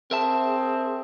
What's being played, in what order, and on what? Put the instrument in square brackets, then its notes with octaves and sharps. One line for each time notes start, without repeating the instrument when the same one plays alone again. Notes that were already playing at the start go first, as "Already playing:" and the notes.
[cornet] C4 [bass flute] G#4 [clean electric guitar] A#4 E5 A5